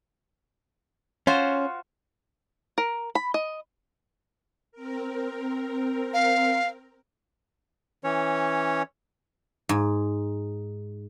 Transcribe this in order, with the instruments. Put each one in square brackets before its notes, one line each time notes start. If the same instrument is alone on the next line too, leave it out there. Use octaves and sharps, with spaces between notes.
[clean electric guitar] C#4 [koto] F4 F#4 C5
[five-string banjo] A#4
B5
D#5
[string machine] C4 A#4
[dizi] F5
[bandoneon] E3 C#4 C#5
[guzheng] G#2